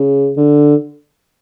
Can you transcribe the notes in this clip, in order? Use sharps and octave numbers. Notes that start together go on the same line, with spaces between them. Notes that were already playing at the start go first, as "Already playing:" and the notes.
Already playing: C#3
D3